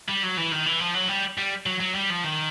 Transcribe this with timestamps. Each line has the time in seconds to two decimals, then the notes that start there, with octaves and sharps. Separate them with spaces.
0.08 G3
0.23 F#3
0.37 E3
0.52 D#3
0.66 E3
0.80 F3
0.95 F#3
1.09 G3
1.38 G3
1.66 F#3
1.80 F#3
1.95 G3
2.10 F3
2.24 D#3